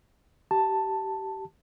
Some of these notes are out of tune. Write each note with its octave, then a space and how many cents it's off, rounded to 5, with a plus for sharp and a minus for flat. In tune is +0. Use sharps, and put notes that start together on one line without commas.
G4 -25 A5 +5